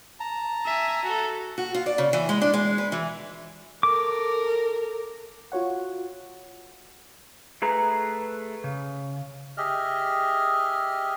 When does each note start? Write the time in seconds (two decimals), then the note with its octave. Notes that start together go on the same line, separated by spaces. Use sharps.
0.20 A5 A#5
0.65 E5 G#5
1.04 F#4 A4
1.58 F#4
1.74 F4
1.86 D5
1.98 C#3
2.13 E3
2.29 G#3
2.42 D4
2.54 G#3
2.78 B4
2.92 E3
3.83 A4 A#4 D6
5.52 F4 F#4 C#5 F#5
7.62 A3 G#4 B4 A#5
8.64 C#3
9.57 G4 G#4 D#5 E5 F6